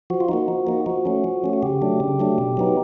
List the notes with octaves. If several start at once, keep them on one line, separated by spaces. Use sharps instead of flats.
F3 F#4
F4
A#3 D#4 F#4
F3
A#3 D#4
F3 F#4
A3 C#4
F3
A3 C#4
F#4
C#3 G4
F#3 A3 D4
C#3
F#3 A3 D4
B2
F#3 B3 D#4